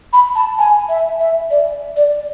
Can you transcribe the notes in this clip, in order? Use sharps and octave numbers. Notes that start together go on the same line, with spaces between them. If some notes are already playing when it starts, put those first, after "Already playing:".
B5
A5
G#5
E5
E5
D5
D5